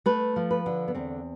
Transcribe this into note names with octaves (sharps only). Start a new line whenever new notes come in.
A3 B4
F3
B4
D3
B3
E2 C4